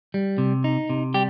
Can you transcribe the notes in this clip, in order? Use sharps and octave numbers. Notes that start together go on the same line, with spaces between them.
G3
C3
D#4
C3
G3 G4